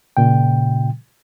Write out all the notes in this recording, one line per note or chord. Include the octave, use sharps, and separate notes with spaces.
A#2 C#3 G5